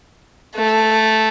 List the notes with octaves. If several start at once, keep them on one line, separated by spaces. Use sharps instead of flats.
A3